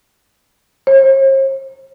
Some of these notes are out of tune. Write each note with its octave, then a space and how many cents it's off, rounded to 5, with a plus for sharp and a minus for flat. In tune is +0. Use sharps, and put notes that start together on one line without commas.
C5 +45